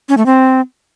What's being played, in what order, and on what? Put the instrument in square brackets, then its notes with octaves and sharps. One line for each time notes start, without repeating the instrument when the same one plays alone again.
[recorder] C#4
A3
C4